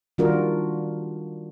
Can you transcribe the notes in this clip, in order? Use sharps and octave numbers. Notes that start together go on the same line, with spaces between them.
D#3 G3 D4 F4 F#4 A#4